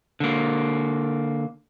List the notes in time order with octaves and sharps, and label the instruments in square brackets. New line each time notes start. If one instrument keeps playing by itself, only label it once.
[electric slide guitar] D3 A#3